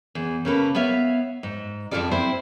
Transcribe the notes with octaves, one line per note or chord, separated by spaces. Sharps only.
E2
C#3 A#3 A4 B4
B3 C#5 E5 F5
G#2
F2 D3 E4 F4 A4 D5
C4 E4 C5